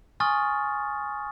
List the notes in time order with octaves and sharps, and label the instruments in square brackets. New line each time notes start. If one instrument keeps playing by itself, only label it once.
[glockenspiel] G#5 C6 C#6 D#6 F6 A6